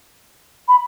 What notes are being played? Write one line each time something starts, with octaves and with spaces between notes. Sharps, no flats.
B5